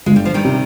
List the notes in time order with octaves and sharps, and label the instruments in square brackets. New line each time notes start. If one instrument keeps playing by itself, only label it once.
[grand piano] G1 [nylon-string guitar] G#3
[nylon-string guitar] G3
F3
D#3 G3
[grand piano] C3